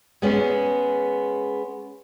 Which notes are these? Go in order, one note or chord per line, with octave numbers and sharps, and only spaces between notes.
G#3 B3 C#4 G#4